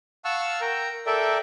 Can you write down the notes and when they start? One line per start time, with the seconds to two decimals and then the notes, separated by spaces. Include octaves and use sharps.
0.25 F5 F#5 A5 C#6 E6 F6
0.61 A#4 G5 A#5
1.07 A4 A#4 D5 E5 G5